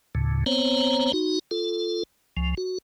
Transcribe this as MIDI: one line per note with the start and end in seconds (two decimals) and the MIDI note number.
0.15 0.44 38
0.15 0.44 45
0.15 0.44 49
0.46 1.12 59
0.46 1.12 60
0.46 1.12 72
0.46 1.12 73
0.46 1.12 82
1.13 1.39 63
1.13 1.39 66
1.51 2.03 65
1.51 2.03 69
2.37 2.54 37
2.37 2.54 53
2.57 2.78 66